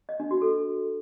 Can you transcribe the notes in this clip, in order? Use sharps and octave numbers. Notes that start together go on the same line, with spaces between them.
D#5
D4
F#4
A4